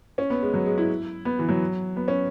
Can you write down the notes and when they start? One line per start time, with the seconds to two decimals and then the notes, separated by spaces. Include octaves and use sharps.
0.18 C#4
0.30 B3
0.42 G#3
0.54 F#3
0.66 G#3
0.78 E4
1.25 B3
1.39 E3
1.49 F#3
1.96 B3
2.08 C#4